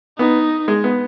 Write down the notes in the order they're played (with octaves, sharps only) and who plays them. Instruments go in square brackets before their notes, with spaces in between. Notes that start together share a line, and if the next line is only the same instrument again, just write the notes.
[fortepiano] B3 [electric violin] D#4
[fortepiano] G#3
B3